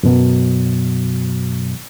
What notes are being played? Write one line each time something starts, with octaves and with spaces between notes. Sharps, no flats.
F#2 B2 F#3